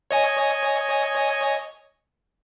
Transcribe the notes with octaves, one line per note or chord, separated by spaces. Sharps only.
C#5 D#5 G#5